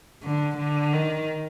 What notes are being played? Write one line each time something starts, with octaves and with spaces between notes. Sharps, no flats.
D3
D3
D#3